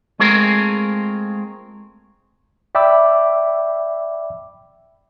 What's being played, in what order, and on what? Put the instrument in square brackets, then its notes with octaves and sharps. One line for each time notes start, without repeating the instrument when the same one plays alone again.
[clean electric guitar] G#3 A3 C4 F4 G#4 A#4
[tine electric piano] D5 E5 G5 B5 D6 E6